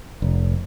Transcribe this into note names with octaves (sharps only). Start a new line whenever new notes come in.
F1